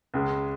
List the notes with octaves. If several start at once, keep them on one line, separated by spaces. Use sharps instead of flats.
C#2 C#3 G#3